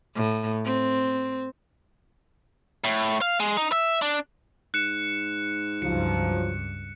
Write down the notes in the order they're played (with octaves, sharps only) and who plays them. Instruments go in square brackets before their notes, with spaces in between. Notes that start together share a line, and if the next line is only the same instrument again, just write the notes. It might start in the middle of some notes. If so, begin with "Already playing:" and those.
[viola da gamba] A2
C4
[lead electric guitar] A2
F5
G#3
D#4
E5
D4
[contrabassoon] G#2 [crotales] F#6 C#7 E7
[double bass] C#2 G2 [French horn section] F3 F#3 [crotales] C#7